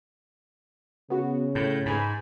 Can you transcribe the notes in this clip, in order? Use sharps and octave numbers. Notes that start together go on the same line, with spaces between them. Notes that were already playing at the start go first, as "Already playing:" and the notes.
C#3 B3 F#4
A2 G6
G#2 B4 G#5 B5